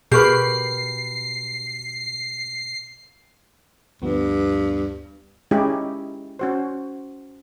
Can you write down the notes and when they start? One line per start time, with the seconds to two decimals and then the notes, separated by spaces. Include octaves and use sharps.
0.12 B2 G4 G#4 A#4 B4 C#6 C7
4.02 D2 G2 F3 B3
5.51 G#3 C#4 D#4 E4 G4 G#4
6.39 C#4 F#4 C5